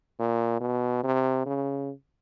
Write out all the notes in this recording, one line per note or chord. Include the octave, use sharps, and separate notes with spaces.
A#2
B2
C3
C#3